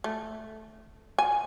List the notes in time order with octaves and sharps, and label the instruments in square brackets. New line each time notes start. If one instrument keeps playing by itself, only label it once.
[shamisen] A3
G#5